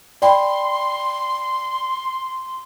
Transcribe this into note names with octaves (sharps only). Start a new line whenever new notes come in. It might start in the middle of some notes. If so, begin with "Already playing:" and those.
D5 G5 B5 C6